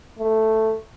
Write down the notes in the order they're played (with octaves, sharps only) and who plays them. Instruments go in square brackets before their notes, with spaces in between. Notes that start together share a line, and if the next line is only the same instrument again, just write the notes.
[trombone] A3